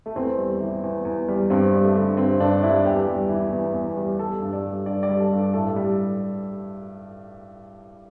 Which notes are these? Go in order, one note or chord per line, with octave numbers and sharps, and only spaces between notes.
A3
E2 C4
G3
E3
E2
E2
G3
G2 C4
G3
A3
D3
G2 C4
G2 D4
G3 E4
E2 G4
G3
E3
E2
E2
G3
G3 A4
G2
D5
G3
G2 D5
D5
G3
A4
G2
A2 A4
G3